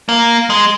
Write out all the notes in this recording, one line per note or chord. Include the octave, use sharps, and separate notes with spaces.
A#3
G#3